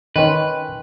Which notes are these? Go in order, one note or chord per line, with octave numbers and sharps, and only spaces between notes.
D#3 C#4 B4 D#5 G5 C6